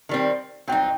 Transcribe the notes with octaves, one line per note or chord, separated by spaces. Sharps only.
D#3 G3 C4
F#3 C4 D#4 G5